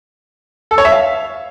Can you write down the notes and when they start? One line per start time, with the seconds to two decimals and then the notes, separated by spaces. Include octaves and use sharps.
0.71 A4
0.78 C#5
0.85 E5
0.92 F5